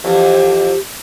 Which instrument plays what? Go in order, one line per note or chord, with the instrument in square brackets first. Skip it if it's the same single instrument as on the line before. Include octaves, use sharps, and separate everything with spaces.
[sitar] F2 E3 [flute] G4